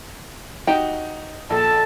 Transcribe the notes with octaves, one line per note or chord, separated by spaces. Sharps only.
D#4 F#4 G4 G5
A#1 A4 A5